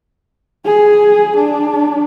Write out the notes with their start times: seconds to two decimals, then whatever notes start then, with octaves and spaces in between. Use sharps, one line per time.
0.66 G#4
1.36 D4